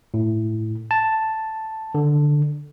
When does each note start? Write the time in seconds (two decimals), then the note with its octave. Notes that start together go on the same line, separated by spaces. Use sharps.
0.14 A2
0.91 A5
1.95 D3